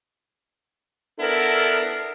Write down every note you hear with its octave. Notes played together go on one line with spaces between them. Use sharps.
B3 D4 E4 A4 A#4